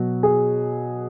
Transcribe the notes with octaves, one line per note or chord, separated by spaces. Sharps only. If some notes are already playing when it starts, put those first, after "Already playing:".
Already playing: B2 F#3
G#4